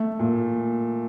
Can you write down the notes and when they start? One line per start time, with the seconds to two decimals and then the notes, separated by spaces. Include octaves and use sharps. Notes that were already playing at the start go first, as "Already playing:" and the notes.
Already playing: A3
0.19 A#2